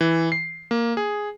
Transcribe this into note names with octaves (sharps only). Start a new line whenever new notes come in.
E3
C7
A#3
G#4